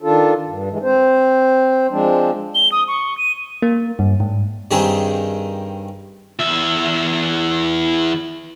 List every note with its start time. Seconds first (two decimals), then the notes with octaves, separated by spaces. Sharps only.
0.02 D#3 D4 F4 A4
0.46 G2
0.70 E3 G#3
0.83 C4 C5
1.90 F3 G#3 C4 D4
2.55 G7
2.72 D#6
2.88 C#6
3.18 D#7
3.62 A#3
3.99 G2
4.20 G#2
4.71 G2 D#3 C4 G#4
6.39 E2 E5